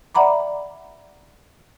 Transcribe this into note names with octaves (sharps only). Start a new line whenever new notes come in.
D5 E5 F#5 A#5 B5 D6